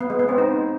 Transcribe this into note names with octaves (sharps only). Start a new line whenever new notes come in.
B3
G#3
B3
C4
D#4